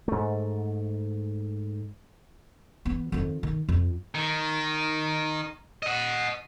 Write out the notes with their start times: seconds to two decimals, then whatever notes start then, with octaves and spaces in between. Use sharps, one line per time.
0.08 G#2 A3
2.85 E3 B3
3.12 F2 D#3
3.43 D#3
3.69 F2
4.15 D#3
5.83 D#5 F#5